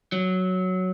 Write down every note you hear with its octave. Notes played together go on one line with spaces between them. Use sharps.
F#3